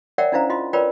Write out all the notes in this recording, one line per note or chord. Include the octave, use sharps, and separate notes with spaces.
A#4 C#5 D5 E5 F#5 G5
C#4 D4 E4 C5 F5 A#5
F4 D#5 C6
F4 A#4 B4 C#5 D5 G5